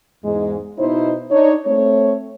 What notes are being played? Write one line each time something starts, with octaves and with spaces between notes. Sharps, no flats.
E2 G#2 G#3
B2 D#4 E4 C5
D4 D#4 C#5
A3 C4 C#5